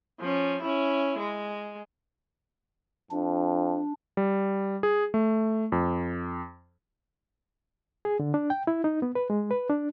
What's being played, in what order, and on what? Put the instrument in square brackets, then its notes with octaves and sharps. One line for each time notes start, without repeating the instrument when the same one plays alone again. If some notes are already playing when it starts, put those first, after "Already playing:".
[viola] F3 C#4
C#4 E4
G#3
[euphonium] F2 [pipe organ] D4
[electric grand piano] G3
G#4
A3
F2
[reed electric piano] G#4
D3
D4
G5
E4
D#4
B3
B4
G#3
B4
D4